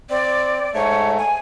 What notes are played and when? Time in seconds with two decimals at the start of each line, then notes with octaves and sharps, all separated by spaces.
0.10 C4 D5
0.74 G#2 A3 C#5
1.18 G#5